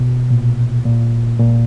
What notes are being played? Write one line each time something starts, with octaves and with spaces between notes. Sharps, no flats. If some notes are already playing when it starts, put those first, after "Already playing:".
Already playing: B2
A#2
A#2
A#2